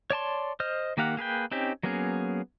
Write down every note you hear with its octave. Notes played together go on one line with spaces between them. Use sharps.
C#5 D5 A5 C6
C5 D#5 F6
D#3 A#3 G4 F5 F#5
A#3 G#4 B4 G5
C4 C#4 D#4 G4
F#3 A#3 B3 C#4 G#4